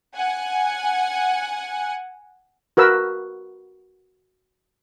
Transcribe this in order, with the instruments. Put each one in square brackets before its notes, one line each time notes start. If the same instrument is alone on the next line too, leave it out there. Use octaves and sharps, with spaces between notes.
[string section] F#5 G#5
[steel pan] F#4 A#4 B4 E6